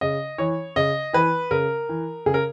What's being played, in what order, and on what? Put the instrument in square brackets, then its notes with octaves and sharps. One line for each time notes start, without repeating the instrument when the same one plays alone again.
[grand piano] C#3 D#5
E3 C#5
C#3 D#5
E3 B4
C#3 A#4
E3
C#3 G#4
A#4